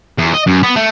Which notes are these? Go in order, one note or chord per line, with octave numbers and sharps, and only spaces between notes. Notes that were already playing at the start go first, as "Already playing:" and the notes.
E2
D#5
F#2
B3
A3